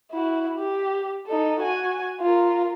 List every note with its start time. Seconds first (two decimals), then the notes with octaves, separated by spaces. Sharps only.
0.12 E4 F#4
0.57 G4
1.26 D#4 A4
1.60 F#4 G#5
2.21 F4 A#4